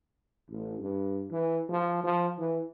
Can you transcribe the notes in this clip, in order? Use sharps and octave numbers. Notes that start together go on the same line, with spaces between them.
A1
G2
E3
F3
F3
E3